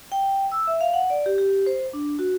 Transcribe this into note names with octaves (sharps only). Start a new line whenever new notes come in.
G5
E6
E5
F5
F#5
D5
G4
G4
C5
D4
F#4